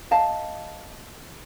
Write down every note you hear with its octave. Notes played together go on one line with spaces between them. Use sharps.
D#5 F5 A5